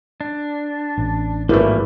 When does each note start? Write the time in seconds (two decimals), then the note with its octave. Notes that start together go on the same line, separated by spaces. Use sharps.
0.21 D4
0.98 A1
1.49 G#1 E3 G3 A3 A#3 E4 B4